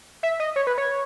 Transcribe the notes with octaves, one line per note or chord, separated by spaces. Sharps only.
E5
D#5
C#5
B4
C#5